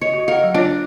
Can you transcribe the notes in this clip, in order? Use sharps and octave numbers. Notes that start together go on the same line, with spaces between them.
C#5 D#5
F#4
A#4 F5 F#5
F#3
D4 F4 C#5